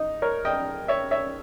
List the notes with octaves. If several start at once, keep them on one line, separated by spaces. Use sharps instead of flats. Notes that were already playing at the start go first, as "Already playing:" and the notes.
Already playing: D#4
A#4 C#5
D#5 G5
C#5 E5
C#5 E5